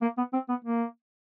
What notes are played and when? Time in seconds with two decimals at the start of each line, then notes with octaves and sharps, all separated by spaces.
0.02 A#3
0.17 B3
0.33 C4
0.49 B3
0.65 A#3